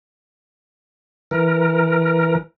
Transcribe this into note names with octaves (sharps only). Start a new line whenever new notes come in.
E3 A#4